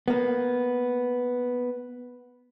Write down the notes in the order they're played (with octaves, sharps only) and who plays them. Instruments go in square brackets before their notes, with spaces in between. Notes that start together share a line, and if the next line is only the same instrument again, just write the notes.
[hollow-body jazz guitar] A#3 B3